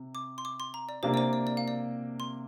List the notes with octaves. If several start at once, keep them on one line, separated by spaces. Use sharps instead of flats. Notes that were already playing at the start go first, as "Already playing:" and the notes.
Already playing: C3
D6
C6
D6
C6
A#5
D5
C3 A#3 D4 C5
D5
C5
D5
D5
F5
D5
C6